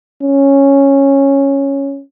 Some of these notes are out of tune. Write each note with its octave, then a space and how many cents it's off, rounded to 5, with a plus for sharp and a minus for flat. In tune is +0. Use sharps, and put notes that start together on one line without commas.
C#4 -5